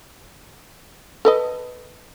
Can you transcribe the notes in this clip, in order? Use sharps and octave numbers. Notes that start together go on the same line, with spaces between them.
A4 B4 D#5